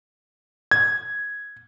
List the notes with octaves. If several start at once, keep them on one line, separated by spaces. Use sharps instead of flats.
G#6